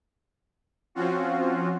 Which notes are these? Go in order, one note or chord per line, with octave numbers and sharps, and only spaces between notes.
F3 C4 C#4 F4 F#4